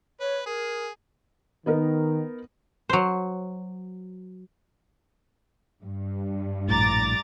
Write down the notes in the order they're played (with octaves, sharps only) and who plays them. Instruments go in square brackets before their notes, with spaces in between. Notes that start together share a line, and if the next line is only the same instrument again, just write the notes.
[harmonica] B4 [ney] C#5
[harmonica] G#4 [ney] A#4
[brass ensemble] D#3 [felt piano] B3 D#4 A#4
[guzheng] F#3 C5
[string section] G2
[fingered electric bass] A#1 A2 [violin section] A#5 D6 A6